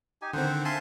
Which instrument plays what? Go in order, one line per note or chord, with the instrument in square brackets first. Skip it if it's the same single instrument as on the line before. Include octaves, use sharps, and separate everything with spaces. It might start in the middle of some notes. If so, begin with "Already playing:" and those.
[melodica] D#4 G4 G#5
[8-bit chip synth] D3 D#3 C4 [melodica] C5 F#5
[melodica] E5 F5 [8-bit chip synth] G#5 A5 C6